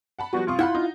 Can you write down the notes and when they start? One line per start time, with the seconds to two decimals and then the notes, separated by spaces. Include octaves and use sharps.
0.19 F#5 A5 B5
0.33 F3 G3 B3 F#4
0.47 C2 F4 C#6 D#6
0.59 E4 F#5 B5 G6
0.75 D#4